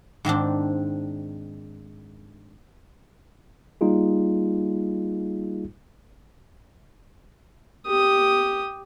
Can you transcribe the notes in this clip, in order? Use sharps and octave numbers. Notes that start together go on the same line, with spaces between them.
G#2 D#3 C4 D4
G3 A#3 D#4 F4 G#4
G4 D#6